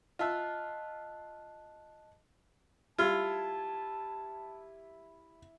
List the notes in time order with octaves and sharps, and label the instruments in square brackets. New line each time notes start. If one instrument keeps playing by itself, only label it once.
[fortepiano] F4 E5 [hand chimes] D#5 A5 F#6
[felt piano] G3 [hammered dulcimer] E4 [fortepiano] F4 [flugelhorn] A5